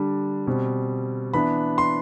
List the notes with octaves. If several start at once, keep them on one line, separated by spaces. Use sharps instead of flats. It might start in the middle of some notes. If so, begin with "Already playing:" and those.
Already playing: D3 G3 D4
B2 G3 C4
E3 B3 D4 B5
C6